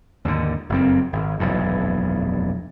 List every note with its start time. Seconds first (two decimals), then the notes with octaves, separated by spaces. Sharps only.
0.25 D#2 G#2 D3
0.69 F#1 F2 C4
1.13 G#1
1.39 F1 B1 E2 G2